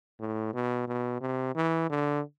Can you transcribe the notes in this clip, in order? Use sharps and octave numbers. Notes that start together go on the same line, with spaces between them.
A2
B2
B2
C3
E3
D3